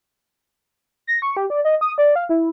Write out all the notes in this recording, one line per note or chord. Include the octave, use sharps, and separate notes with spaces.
A#6
C#6
G4
D5
D#5
D#6
D5
F5
E4